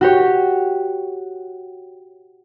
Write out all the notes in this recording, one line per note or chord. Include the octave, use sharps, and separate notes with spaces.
F#4 G4 C#5